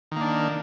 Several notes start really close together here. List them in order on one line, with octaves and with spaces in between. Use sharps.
D#3 A#3 D4